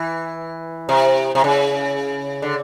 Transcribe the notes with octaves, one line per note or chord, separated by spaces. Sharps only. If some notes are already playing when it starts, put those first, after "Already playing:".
Already playing: E3
C3
C3
C#3
D3